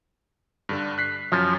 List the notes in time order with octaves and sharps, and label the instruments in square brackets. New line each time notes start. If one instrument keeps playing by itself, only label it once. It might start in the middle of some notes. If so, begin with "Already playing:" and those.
[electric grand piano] G2 D3 D4
F#6 B6 C7
[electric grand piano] F#2 F#3 C#4 [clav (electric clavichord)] F3